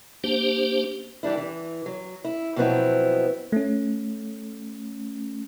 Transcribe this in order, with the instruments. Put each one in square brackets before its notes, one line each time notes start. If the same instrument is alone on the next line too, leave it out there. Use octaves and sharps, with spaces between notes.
[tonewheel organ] A#3 D4 G4 C5
[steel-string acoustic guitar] E3 G3 D4 E4
E3
F#3
E4
B2 F3 F#3 B3 C4 E4
[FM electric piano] A3 C#4